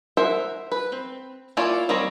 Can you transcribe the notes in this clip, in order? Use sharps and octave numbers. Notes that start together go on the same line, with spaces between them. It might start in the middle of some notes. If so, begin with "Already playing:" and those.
A#4 C5 E5 F#5
B4
C4
A#3 E4 F4 C#5 D5
D#3 G3 C4 C#5 A#5